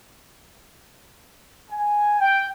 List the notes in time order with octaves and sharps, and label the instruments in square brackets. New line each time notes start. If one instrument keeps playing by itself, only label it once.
[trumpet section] G#5
G5